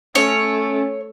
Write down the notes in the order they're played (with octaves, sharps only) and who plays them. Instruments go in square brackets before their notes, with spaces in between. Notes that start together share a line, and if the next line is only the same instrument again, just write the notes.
[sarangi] A3 [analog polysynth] C#4 [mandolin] C#5